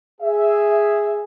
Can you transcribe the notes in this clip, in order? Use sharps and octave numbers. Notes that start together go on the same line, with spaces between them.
G#4 E5